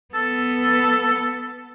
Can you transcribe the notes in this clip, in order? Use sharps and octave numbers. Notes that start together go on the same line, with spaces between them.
B3 A4